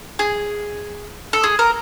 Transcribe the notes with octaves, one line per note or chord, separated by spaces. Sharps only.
G#4
A4
G#4
A#4